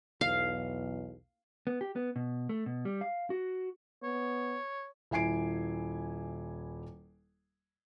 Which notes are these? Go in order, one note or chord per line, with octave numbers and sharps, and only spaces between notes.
B1 E2 F5
B3
G4
B3
B2
A3
B2
G3
F5
F#4
B3 C#5
D#1 E4 G#5 C7 D7